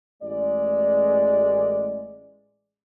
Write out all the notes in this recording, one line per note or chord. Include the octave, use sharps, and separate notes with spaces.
A1 G#3 D5